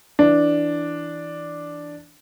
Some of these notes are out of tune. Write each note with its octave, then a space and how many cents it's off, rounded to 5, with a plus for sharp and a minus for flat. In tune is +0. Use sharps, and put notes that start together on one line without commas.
E3 +0 D4 +0